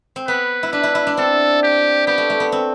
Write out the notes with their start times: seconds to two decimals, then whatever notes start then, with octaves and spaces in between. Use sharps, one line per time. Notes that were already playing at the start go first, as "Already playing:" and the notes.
0.16 C4
0.27 B3 B4
0.63 E4
0.72 D4 B4
0.83 E4
0.95 E4
1.07 D4
1.17 C4 A4
1.63 G4
2.07 B3 G4
2.18 A3
2.30 A3
2.40 B3
2.52 C4